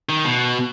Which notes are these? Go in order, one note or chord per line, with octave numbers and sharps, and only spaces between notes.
D#3
B2